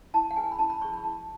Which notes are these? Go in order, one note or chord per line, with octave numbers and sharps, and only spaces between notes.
E4 A5
F#5
G#4 B4 G#5
B5
E4 A5
B5
G#4 C#5 C#6
B5
E4 A5